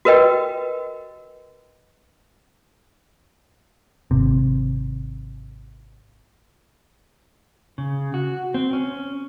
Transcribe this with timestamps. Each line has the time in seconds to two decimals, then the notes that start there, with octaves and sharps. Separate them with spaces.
0.05 F#4 A#4 B4 D#5 G5
4.11 G#1 C3
7.78 C#3
8.14 F#4
8.54 C4
8.73 C#4